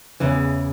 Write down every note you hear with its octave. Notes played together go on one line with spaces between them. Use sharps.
E2 C#3 E3